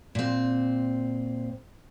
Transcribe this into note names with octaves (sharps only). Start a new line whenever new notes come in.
A#2 C4